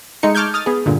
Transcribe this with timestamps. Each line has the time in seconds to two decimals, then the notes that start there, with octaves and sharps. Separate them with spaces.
0.23 G#3 A3 D#4 C#7
0.35 A5 C#6 D6 F6 G6 G#6
0.54 D#6 F6 A6
0.66 B3 G#4
0.86 G2 A#2 D3